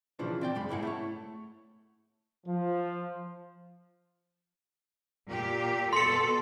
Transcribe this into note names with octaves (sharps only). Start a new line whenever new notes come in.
B1 A#2 C#3 E3 F3 D4
C4 D5 G5
F#2 G#3 B5
G#2 C#3 A#3 E4 G#4 F#5
A3 E4 C#5
F3
A#2 G4
B2 A4 C6 C#7